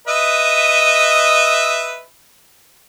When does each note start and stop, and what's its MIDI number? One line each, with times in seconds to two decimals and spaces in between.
0.08 2.03 71
0.08 2.03 75
0.08 2.03 76